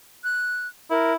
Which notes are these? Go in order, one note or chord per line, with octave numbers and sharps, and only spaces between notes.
F#6
E4 A#4